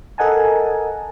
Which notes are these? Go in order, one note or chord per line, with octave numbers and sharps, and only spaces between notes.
A4 A#4 D#5 F#5 G#5 A5